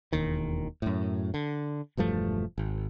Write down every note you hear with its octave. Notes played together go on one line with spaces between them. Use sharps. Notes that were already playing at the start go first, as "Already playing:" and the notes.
E1 D#2 D#3
F#2 A2
D3
E1 G2 F3 A3
G#1